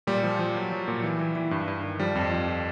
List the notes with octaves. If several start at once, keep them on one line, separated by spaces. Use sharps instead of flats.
A#2 G3
F3
F3
F#3
F#3
A#2
E3
E3
E3
G2
G2
D#3
F3 G3
F2
F3